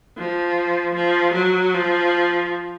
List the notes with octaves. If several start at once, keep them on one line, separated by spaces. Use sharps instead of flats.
F3
F3
F#3
F3